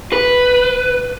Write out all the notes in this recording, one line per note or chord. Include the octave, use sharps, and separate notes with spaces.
B4